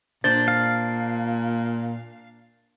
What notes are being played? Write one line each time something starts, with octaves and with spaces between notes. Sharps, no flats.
A#2 D4 C5 A6
F5